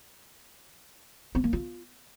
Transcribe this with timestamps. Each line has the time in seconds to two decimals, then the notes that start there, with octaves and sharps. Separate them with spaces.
1.35 C4
1.44 A#3
1.53 F4